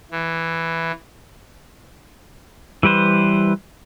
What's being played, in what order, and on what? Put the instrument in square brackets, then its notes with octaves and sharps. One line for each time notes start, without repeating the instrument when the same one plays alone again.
[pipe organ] E3
[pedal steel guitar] E3 G3 B4 C5